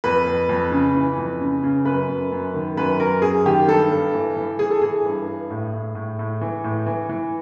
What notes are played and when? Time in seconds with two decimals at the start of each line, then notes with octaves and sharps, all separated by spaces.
0.04 F2 B4
0.27 F2
0.49 F2
0.72 C#3
0.95 E3
1.18 F2
1.41 C#3
1.63 C#3
1.85 F#2 B4
2.09 F#2
2.32 F#2
2.54 D#3
2.77 F#2 B4
3.00 F#2 A#4
3.22 F#2 G#4
3.45 D#3 G4
3.68 G2 A4
3.91 G2
4.14 E3
4.37 E3
4.59 E3 G#4
4.70 A4
4.81 E3 G#4
5.05 G2
5.28 G2
5.51 A2
5.74 A2
5.95 A2
6.19 A2
6.41 E3
6.64 A2
6.86 E3
7.09 E3